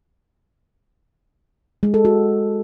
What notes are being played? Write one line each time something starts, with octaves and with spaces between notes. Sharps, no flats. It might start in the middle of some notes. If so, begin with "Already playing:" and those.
G#3
A4
F#4